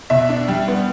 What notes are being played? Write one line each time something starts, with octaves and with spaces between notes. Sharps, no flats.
B2 E5
D4
G3
B3